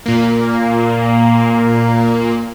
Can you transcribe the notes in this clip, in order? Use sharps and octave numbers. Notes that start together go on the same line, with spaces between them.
A#2 A#3